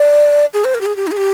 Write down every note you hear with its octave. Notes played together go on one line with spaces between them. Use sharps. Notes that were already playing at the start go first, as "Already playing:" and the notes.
Already playing: D5
G#4
C5
A#4
G4
G#4
G4
D#4
G#4
G4